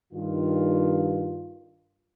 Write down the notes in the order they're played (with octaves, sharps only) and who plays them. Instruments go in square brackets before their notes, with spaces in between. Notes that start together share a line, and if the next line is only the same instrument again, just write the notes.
[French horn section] G2 D#3 F4